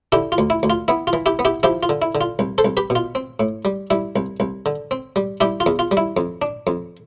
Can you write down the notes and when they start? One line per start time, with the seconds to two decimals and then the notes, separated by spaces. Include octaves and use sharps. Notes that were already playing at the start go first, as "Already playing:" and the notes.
0.12 D3 E4 G4
0.32 F4
0.38 D2
0.50 E4
0.63 D2
0.70 F4
0.88 B3 E4
1.07 F4
1.13 E3
1.26 E4 G4
1.39 B3
1.45 E4 G4
1.63 F3 E4 G4
1.83 F4
1.89 D3
2.02 E4
2.15 D3
2.21 F4
2.39 C2
2.58 A4 C5
2.65 C2
2.77 G4 B4
2.90 B2
2.95 F4
3.15 C4
3.40 A2
3.65 G3
3.90 G3 E4
4.16 C2
4.40 C2
4.66 D3
4.91 C4
5.16 G3
5.41 G3 E4 G4
5.60 F4
5.66 E2
5.79 F4
5.91 G3
5.97 E4
6.17 F2
6.42 D4
6.67 F2